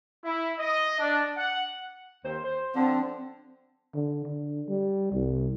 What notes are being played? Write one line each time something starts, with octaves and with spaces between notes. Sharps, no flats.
E4
D#5
D4
F#5
D#2 C5
C5
D3 F3 C4
D3
D3
G3
C2